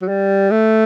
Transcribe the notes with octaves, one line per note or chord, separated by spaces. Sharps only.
F#3
G3
A3